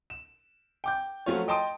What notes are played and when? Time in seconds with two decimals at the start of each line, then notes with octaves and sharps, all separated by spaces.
0.10 E7
0.84 G5 D6 G6
1.26 F3 F#3 A3 C#4 F4 C#5
1.48 D#5 G5 A5 C6 D#6 D7